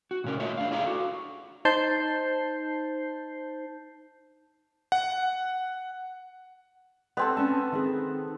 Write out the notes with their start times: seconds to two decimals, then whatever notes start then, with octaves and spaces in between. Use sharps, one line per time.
0.11 F#4
0.24 A#2 C#3 C#4 A#4
0.40 A3 F4 F#4 C#5 D#5 E5
0.58 D4 F5
0.71 E4 F4 G#4 D5 F5 A#5
0.85 F#4 A4
1.65 D#4 C5 A5 G6 C7
4.92 F#5
7.17 B3 C4 A4 D5 D#5 G5
7.37 C4 C#4 A5
7.72 D#3 C4 G#4